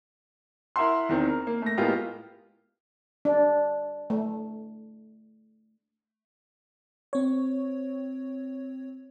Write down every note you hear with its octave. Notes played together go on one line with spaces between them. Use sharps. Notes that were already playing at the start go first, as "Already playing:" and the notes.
E4 A#4 E5 F#5 C6
E2 D#3 C4
A#4
A#3
A3 A#6
A2 G#3 A#3 B3 F4 G4
D4
A3
C4 C#5